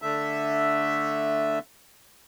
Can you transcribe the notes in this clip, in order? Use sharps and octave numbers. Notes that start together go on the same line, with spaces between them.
D3 A3 E5